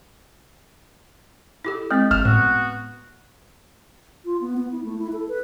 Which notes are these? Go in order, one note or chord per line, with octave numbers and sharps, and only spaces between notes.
E4 G4 A4
G#3 C4 F6 A6 B6
G1 F6 E7
A2 B3 F#4
F4
B3
B3
E4
A3
E4
A4
B4